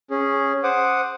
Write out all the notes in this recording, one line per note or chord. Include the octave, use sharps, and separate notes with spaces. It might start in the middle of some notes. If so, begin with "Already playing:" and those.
C#4 G#4
C5 F#5 D6 D#6